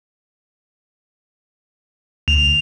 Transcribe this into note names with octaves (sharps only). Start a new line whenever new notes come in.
D2 F7